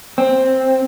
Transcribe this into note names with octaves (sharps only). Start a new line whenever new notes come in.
C4